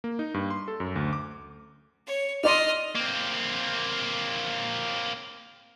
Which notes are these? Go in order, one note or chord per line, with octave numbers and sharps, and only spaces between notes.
A#3
D#4
G2
C6
A4
F#2
D2
D6
C#5
D#4 D5 D#5 C6 F6
A#3 C4